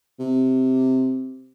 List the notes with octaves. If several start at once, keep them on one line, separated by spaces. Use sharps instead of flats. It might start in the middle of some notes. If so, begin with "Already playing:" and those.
C3